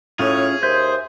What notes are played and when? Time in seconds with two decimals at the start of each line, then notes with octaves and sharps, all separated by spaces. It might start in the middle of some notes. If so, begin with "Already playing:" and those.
0.19 A2 C#4 F4 G#4
0.63 D#2 C5 E5 G6